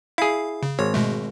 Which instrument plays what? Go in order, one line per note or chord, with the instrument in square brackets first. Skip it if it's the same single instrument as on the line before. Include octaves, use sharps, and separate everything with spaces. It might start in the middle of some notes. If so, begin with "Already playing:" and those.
[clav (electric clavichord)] E4 G#4 [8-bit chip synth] F5
[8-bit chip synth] C#3
[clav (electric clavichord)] G#1 [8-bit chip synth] C#5
[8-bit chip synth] B2 G#3 A3